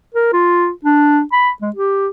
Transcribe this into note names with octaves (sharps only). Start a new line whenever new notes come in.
A#4
F4
D4
B5
G#3
G4